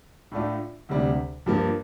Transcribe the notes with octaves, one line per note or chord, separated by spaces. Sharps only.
A2 A3 D4 F4
D2 C3 G3 D4
G2 F3 A#3